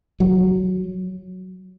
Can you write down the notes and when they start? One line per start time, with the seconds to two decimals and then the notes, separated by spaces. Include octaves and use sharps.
0.20 F#3